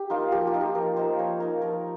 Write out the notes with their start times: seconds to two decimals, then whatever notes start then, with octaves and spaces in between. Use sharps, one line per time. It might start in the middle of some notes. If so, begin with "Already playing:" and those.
Already playing: G4
0.10 A#3 D#4 F4
0.32 F3 G4
0.47 F4
0.54 A#3 D#4
0.61 G4
0.75 F3 A#4
0.97 A#3 D#4 C5
1.19 F3 C#5
1.40 A#3 D#4 A#4
1.62 F3 A#4